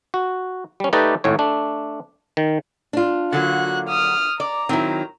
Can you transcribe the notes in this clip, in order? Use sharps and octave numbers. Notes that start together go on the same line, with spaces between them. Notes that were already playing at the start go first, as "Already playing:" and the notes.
F#4
G3 C#4
A3 D#4 G4 B4 D5 D#5
G#1 A2 C#5
A3 D4
D#3
D4 F4
D3 F#3 A#3 F#4 F#6
D#6 F6
D5 A#5
D#3 F#3 C4 E4